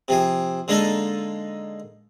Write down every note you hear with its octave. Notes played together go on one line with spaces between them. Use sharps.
C3 F3 G#4
D3 G#3 A#3 D#4 A4